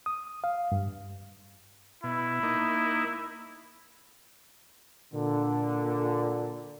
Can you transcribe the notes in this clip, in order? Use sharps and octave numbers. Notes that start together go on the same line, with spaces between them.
D#6
F5
G2
B2 E4
A#3 D#4
A#2 D3